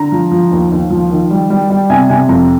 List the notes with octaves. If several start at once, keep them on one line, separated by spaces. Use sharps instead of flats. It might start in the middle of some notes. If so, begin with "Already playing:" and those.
Already playing: D3 A#5
F3
F3
D#2
D#2
F3
D#3
G3
G3
G3
C3 G#5
C3 G#5
F2 A#5